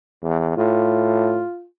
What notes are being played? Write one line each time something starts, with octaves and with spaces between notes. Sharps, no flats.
E2
A2 F4